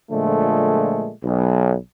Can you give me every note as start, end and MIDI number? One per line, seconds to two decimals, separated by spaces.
0.11 1.11 46
0.11 1.11 50
0.11 1.11 53
0.11 1.11 56
0.11 1.11 57
1.24 1.75 35